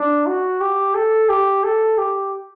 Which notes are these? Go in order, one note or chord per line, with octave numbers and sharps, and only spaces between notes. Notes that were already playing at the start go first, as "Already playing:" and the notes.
Already playing: D4
F#4
G4
A4
G4
A4
G4